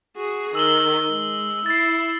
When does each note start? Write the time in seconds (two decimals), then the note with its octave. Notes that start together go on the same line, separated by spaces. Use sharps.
0.16 F#4 G#4
0.55 D#3 E6 F#7 G7
1.06 G#3
1.66 E4 A6 C7